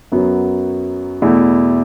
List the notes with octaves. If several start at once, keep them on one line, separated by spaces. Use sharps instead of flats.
F#2 F#3 B3 F#4
E2 B2 A3 E4